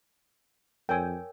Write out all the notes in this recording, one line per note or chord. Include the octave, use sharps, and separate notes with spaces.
F2 A#4 C#5 G5 G#5 E6